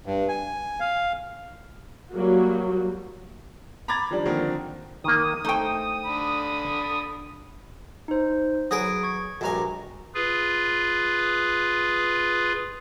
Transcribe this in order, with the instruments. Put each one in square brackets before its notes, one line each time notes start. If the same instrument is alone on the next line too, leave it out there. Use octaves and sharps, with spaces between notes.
[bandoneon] G2
G#5
F5
[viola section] F#3 G3 A#3 F#4
[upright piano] A#5 B5 D6 G#6 A6
D#3 F3 G3 D4
D3 D#3 F3 A#3 C4 A#4
[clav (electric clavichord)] D#3 A#3 [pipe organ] D#6
[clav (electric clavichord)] A3 A4 C5 [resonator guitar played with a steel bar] D#4 G5
[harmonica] D3 B5
[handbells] D#4 C5
[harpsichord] F#3 G#4 B4 [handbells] D#6 G#6 D7
[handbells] C#6 G#6
[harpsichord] A#1 G2 G#5 [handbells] F#4 A#5
[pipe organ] F4 G#4 B4